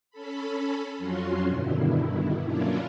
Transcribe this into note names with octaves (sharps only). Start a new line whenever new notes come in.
C#4 A4 B5
F2 F#3 C#4 F4 F#4 C6
G2 B2 D3 D#3 E4
F#3 A#3 C#4 D4 E4 F4